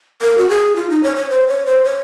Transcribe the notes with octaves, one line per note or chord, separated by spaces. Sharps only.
A#4
F#4
G#4
F4
D#4
C#5
C#5
C5
C#5
C5
C#5